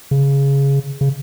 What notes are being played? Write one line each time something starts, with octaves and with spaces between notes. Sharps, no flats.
C#3
C#3